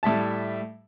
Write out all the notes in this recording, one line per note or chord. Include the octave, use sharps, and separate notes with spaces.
A2 G3 E5 A5